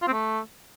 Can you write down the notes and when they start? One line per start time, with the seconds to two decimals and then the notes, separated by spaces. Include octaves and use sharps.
0.02 F4
0.07 C4
0.13 A3